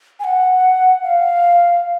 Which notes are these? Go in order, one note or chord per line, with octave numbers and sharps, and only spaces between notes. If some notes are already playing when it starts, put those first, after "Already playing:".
G#5
F#5
F5